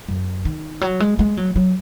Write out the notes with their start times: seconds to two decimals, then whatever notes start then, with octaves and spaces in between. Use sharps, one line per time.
0.08 F#2
0.45 D#3
0.81 F#3
1.00 G#3
1.19 G#3
1.37 F#3
1.56 F#3